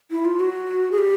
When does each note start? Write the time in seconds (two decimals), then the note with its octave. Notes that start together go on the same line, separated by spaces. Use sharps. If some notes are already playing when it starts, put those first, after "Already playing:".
0.11 E4
0.25 F4
0.40 F#4
0.91 G#4
0.98 G4